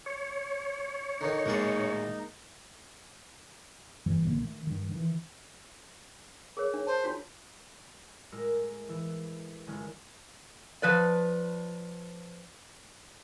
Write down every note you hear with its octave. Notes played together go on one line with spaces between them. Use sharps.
C#5
D3 D#3 D#4
A2 D#3 G#3 A#3 G#4 D5
F#1 G2 E3 G3
A1 D3 G#3 A#3
D#3 A3
G2 D#3
D#3 E3
G#4 A#4 C#5
D4
C5 A5
D4 F4 F#4
A2 G#3 A#4 E6
E3 E6
G1 D#3 G#3 C#4 E4 F6
F3 B4 D5